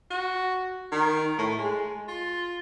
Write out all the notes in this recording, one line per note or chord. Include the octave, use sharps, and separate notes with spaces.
F#4
D#3
A2
G#3
F4